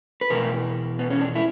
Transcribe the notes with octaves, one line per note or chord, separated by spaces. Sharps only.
B4
E2 B2 A#4
B3
C#4
D4
E4